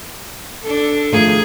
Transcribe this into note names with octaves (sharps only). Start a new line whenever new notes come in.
D4 A4
D#3 F3 A3 G#4